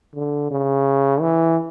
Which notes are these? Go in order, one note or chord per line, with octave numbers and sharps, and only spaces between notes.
D3
C#3
E3